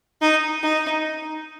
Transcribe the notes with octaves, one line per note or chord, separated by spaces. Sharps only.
D#4
D#4